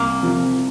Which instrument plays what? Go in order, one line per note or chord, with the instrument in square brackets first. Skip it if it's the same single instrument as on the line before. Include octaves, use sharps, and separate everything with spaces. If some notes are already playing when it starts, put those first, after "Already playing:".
Already playing: [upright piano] C2 [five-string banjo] A#3
[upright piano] C3 F3